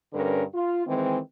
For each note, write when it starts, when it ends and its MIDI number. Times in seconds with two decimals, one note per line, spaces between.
0.13 0.43 43
0.13 0.43 50
0.13 0.43 61
0.13 0.43 70
0.13 0.43 71
0.54 0.86 65
0.86 1.18 51
0.86 1.18 52
0.86 1.18 56
0.86 1.18 60